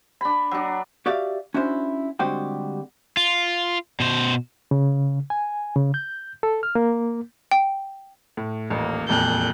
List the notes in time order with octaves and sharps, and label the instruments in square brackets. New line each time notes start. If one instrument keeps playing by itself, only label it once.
[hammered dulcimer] D4 B5
F#3 D4
[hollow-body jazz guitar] F#4 G4 D5 E5 F5
C#4 D4 E4 F#4 C5
D3 G3 G#3 C4 F#4 G4
[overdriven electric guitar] F4
B2 C5
[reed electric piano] C#3
G#5
C#3
G6
A4
F6
A#3
[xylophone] G5
[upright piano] A2
[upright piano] D#1 A1 [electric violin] A#3
[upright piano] E1 F2 A#2 [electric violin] F#6 G6